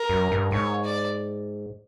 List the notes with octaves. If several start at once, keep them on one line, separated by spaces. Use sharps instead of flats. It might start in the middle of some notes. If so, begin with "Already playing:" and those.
Already playing: A#4
F#2
G2
G#2 C#5
D5